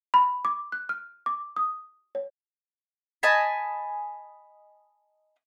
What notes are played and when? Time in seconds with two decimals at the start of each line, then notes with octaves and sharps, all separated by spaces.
0.14 B5
0.45 D6
0.72 F#6
0.89 F6
1.26 D6
1.56 D#6
2.15 C#5
3.23 D#5 G#5 A5 B5